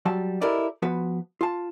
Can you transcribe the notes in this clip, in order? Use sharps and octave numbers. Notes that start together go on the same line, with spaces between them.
F#3 G3 A5
E4 G4 A4 A#4 D5 D#5
F3 B3 F#4 B4
F4 A5